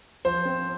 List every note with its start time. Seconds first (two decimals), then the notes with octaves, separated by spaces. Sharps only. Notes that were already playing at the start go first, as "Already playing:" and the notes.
0.25 F3 C5
0.45 C4